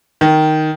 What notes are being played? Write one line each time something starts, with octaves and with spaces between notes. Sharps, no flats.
D#3